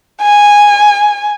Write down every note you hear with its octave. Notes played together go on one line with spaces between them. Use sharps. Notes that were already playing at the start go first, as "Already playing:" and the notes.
G#5